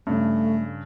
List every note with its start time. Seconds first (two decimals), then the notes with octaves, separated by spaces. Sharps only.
0.07 G2 C#3 A3